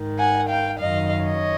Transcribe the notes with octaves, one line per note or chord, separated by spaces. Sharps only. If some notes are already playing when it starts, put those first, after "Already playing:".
Already playing: G#2 D#3
F#5 G#5
F5 G5
F#2 D#3 D#5 F5
C#5 D#5